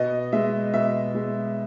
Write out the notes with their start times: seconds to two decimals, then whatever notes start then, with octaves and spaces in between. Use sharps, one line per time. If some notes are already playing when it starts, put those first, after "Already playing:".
Already playing: B2 D#5
0.32 G#3 E5
0.74 B2 E5
1.15 G#3